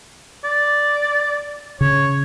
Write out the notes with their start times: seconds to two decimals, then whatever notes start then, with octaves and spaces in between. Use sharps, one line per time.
0.44 D5
1.81 C#3 C#5